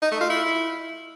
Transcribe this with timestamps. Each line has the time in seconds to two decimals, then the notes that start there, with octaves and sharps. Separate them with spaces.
0.02 D#4
0.12 A3
0.21 F4
0.30 E4